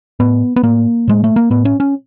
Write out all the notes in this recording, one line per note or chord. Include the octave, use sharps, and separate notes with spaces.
A2 B3
B3
A2 A#3
A2 G#3
A3
A#3
A2 B3
C#4
C#4